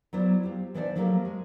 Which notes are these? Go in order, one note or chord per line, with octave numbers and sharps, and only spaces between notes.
F#3 B3 E4 C5 D5
F4 G4
E3 D4 D#4 C5 D5
F3 F#3 A3 A#3 G4 A#4
G#3